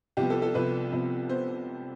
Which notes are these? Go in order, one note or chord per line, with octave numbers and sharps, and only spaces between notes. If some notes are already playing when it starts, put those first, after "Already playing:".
C2 C3 F3 B3 G4
A4
A4
C2 C3 F3 B3 B4
C2 C3 F3 B3
B3 C5